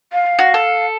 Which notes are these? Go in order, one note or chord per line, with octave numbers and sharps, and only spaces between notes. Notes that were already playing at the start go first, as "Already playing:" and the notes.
F5
F#4
A4